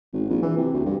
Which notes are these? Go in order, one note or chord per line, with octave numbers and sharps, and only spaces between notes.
G#1
A#1
E3
C3
D2
G2